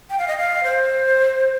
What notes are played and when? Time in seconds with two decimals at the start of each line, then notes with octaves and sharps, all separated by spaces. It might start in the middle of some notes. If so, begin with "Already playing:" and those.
0.10 G5
0.18 F5
0.28 D#5
0.38 F5
0.64 C5